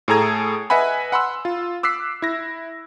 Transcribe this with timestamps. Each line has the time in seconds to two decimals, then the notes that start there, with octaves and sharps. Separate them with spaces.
0.08 A2 G#4 A4 A#5 G#6 D#7
0.70 B4 D#5 E5 F#5 G#5 B5
1.12 F#5 B5 C6 E6
1.45 F4
1.83 D6 E6 F#6 B6 C7
2.22 E4 A#6